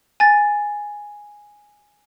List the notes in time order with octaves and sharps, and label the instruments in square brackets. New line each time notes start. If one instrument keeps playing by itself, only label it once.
[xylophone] G#5 A6